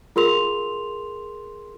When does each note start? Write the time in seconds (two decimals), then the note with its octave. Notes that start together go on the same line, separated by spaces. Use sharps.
0.16 F4 G#4 A#4 C6 F7